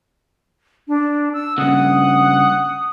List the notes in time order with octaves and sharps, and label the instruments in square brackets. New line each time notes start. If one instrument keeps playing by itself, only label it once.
[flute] D4
E6
[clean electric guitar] G2 C#3 [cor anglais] F#5 [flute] D#6